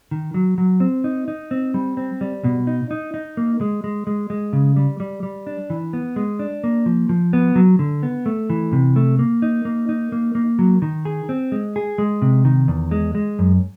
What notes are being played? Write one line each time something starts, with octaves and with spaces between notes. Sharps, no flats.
D#3
F#3
F#3
C4
D#4
D#4
C4
G3
C4
G3
B2
D#4
D#4
D#4
A#3
G#3
G#3
G#3
G#3
C#3
G3
G3
G3
D4
E3
B3
G#3
D4
A#3
F3
F3
B3
F#3
D3
B3
A3
E3
C3
A3
A#3
D#4
A#3
D#4
A#3
A#3
F#3
D#3
G#4
C4
G#3
G#4
G#3
C3
D#3
E2
G#3
G#3
F#2